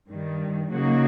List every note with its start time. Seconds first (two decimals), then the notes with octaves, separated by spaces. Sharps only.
0.08 G2 D#3 G3
0.72 C#3 F#3 A#3 D#4 F#4